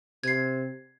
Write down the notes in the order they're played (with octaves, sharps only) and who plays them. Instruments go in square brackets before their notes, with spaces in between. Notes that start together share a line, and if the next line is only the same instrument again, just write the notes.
[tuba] C3 [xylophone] G#6 C7